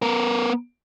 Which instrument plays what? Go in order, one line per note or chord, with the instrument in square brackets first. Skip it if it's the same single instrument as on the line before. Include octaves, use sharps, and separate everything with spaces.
[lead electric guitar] B3 A#4